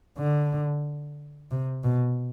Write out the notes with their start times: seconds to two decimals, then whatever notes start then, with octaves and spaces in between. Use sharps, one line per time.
0.18 D3
1.51 C3
1.84 B2